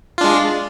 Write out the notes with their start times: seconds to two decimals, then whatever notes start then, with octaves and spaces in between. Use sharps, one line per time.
0.18 F4
0.21 D4
0.24 G#3